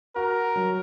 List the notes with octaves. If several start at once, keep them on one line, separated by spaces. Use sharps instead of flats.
F#4 A#4
F#3